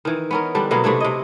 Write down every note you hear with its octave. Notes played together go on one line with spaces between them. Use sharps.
D#3 E3
B3 C#4 A#4
D3 G3 D4
B2 F#3 A#3 B3
C3 A3 D4 E4
C3 D#5